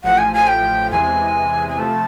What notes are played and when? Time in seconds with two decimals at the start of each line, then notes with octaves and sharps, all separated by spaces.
0.04 A1 A2 F3 F#5
0.18 G#5
0.33 G#5
0.47 G5
0.91 E2 C3 E3 G#3 G#5
1.69 G#5
1.78 C3 F3 A3 A5